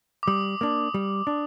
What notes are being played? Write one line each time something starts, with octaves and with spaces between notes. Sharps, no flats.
D6
G3 D#6
A#3 D4
G3
D4